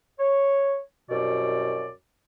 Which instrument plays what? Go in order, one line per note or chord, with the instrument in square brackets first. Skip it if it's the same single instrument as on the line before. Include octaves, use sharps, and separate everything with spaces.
[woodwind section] C#5
C2 F#2 B2 D5